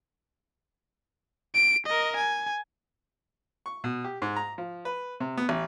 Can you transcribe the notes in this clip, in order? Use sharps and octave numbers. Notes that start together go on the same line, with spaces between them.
D7
A#4 D#5
G#5
C#6
B2
G4
G#2
A#5
F3
B4
C3
B3
A1